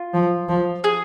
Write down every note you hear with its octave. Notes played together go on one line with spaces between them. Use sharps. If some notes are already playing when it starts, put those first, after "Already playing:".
Already playing: F4
F3
F3
G#4